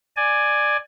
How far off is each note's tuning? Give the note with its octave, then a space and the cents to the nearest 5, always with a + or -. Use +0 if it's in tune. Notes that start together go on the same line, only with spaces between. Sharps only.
D5 +15 G#5 +0